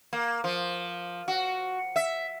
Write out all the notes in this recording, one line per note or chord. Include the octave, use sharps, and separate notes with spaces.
A#3
F3
F#4
E5